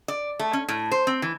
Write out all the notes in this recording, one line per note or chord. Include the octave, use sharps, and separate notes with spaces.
D5
A3
C#4
A2
C5
C4
E3